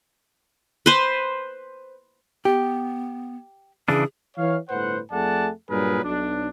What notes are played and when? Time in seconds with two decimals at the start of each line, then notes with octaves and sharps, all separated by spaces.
0.86 B4 C5
2.45 B3 G4
3.88 C#3 E3 D4 G#4
4.37 E3 C#5 F5
4.69 G1 A2 B4 C5 F#5
5.12 F2 A3 G#4 D5 F#5 A5
5.70 G2 A#2 F#3 G#4 A#4 B4
6.04 B1 D4